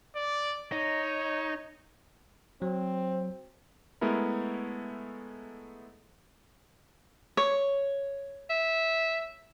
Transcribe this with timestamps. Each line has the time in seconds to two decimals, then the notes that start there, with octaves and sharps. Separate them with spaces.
0.16 D5
0.72 D#4 C#5
2.62 F#3 C4
4.01 G#3 A3 B3 E4 A#4
7.37 C#5
8.50 E5